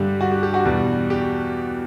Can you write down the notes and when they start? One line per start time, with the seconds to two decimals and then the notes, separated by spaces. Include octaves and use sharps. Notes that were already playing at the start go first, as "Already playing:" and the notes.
Already playing: G2 D3 G3 G4
0.21 F#4
0.31 G4
0.43 G4
0.54 F#4
0.65 E2 B2 G3
1.10 G4